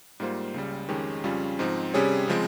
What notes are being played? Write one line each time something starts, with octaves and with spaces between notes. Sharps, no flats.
G#2 G3 A#3 F4 C5
C#2 C#3 G3
F2 D#3 G#3 C#4 G4
F2 C#3 G3 C#4 F4
G#2 F3 C4 D#4
C3 G3 C#4 G#4 C#5
C#3 F3 G#3 C4